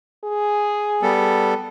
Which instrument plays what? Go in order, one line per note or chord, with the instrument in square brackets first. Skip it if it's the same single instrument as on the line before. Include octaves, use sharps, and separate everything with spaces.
[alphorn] G#4
[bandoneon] G3 B3 A4